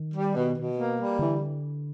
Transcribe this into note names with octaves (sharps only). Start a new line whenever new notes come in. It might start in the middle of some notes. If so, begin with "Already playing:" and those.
Already playing: D#3
G3
B2
B2
A#3
G3
D3 E3